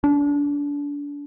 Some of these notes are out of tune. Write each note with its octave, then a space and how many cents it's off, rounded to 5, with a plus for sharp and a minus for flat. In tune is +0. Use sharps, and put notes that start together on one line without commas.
D4 -30